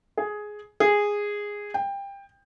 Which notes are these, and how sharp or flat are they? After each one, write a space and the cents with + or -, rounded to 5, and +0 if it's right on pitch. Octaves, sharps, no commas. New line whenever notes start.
G#4 +10
G#4 -10
G5 +20